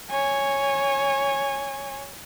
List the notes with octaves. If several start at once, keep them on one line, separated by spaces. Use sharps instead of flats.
C#5 G#5